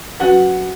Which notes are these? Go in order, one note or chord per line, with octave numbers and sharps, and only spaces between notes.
F#3 C#4 F#4 B4 F#5